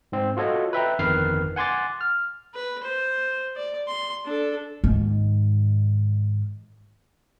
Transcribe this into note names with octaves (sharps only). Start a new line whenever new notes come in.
G#2 C4
F4 F#4 A4 C#5 D#5
B4 E5 G5 A#5
G1 F2 D#3 B4 F6 C7
F#5 G#5 C6 D6 A6
F6
B4
C5
D5
C6
D4 A4
G#2 D#3